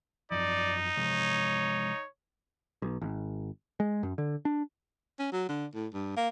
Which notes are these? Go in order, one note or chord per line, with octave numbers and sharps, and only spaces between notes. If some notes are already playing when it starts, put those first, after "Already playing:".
F#2 F3 D#4 D5
C3 F3 G#3 C#5
B1
G#1
G#3
F#2
D3
D4
C#4
F#3
D3
A2
G2
A#3